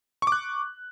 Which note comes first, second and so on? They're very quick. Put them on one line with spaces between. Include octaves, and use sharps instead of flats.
C#6 D6 F#6